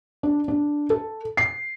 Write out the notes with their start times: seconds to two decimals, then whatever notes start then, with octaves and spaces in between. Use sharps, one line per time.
0.23 D4
0.48 D4
0.90 A4
1.37 C7